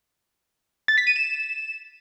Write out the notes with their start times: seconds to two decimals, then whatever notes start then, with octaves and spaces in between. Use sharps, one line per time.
0.88 A6
0.98 B6
1.07 D#7
1.16 E7